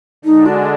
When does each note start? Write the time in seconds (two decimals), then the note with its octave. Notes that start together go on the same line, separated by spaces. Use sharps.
0.24 D3 G#3 D4 D#4
0.46 F#4